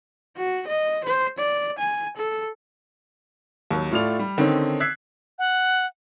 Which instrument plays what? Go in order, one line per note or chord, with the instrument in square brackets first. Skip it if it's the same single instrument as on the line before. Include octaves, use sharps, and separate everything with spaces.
[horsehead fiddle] F#4
D#5
C5
D5
G#5
A4
[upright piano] D#2 F#3
A2 A3 F4 D5 F7
G3
D3 D#3 C4 C#4 D#4
E6 F#6 G#6 B6 C7
[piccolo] F#5